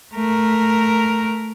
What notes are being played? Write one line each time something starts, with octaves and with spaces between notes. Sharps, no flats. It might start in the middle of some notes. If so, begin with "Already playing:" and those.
A3 A#4